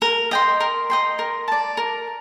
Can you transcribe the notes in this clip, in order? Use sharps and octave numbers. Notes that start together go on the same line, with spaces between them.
A#4
D#5 G5 C6
A#4
D#5 G5 C6
A#4
D5 A5
A#4